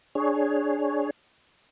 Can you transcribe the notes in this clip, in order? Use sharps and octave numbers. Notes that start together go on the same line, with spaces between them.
D4 G#4 C#5